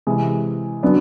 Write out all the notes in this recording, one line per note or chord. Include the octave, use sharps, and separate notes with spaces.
C3 E3 G#3
D3 F#3 B3 D4